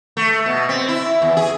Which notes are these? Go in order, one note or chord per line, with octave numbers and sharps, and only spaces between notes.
A3
B2
C4
E4
E2
G#4